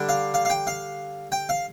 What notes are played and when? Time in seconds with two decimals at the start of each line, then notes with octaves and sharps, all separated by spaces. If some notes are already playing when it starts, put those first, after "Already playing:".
Already playing: D3 G3 D4
0.09 F5
0.34 F5
0.45 F5
0.50 G5
0.67 F5
1.32 G5
1.49 F5